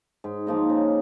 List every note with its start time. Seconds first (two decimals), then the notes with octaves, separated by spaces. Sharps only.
0.24 G#2
0.47 F3 A#3 D#4
0.70 C#3